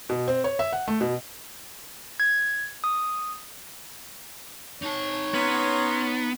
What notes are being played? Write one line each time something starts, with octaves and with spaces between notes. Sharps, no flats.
B2
C4
C#5
E5
F#5
A3
B2
G#6
D#6
D#4 C#5 A5
B3 C#4 A#5 C6